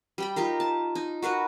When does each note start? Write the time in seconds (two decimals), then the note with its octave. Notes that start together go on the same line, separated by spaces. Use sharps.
0.18 G3 G5 B5
0.36 D#4 F4 G4 A#4
0.60 A5
0.95 D#4
1.22 F#4 A#4 B4 F#5